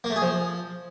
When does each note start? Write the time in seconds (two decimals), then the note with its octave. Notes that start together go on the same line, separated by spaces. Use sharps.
0.04 A#3
0.10 A3
0.16 G#4
0.22 F3